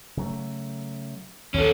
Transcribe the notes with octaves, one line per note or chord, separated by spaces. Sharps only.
C#3 F#3 A3
D#2 D#3 E3 C#4 A4